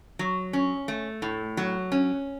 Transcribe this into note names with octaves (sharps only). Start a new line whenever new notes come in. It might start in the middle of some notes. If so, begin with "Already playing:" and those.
F#3
C#4
A3
A2
F#3
C#4